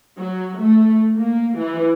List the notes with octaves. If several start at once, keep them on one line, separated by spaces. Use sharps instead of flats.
F#3
A3
A#3
E3